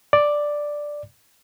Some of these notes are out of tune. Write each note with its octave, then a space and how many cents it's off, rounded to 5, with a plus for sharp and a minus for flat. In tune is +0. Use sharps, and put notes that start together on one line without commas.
D5 +0